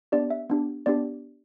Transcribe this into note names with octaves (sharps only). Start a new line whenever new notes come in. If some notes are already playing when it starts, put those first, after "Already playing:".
B3 D4 G4 D5
E5
B3 D4 G4
B3 D4 G4 D5